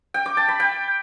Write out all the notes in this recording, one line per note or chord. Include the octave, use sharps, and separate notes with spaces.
G5
D6
A5
B5
G5